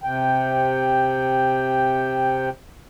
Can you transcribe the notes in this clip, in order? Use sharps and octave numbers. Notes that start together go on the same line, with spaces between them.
C3 G5